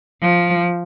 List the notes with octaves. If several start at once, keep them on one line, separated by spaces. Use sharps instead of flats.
F3